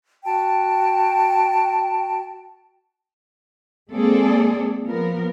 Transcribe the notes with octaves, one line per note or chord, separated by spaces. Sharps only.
F#4 G5 A5
G#3 A#3 C4 G#4 A4 D5
F3 B3 A#4